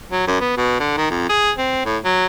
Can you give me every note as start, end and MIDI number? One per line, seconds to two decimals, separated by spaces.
0.12 0.25 54
0.28 0.38 42
0.41 0.56 59
0.57 0.76 47
0.80 0.93 50
0.97 1.07 51
1.11 1.27 41
1.29 1.51 68
1.58 1.81 60
1.86 1.97 45
2.05 2.26 54